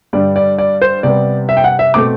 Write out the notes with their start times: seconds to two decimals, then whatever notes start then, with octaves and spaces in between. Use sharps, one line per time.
0.13 G2 D3 G3 D5
0.36 D5
0.58 D5
0.82 C5
1.03 C3 G3 B3 D5
1.49 E5
1.57 G5
1.64 F#5
1.79 E5
1.94 B2 A3 C4 D6